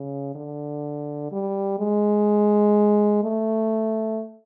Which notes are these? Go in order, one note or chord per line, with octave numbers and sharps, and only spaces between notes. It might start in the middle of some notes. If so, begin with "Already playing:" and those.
Already playing: C#3
D3
G3
G#3
A3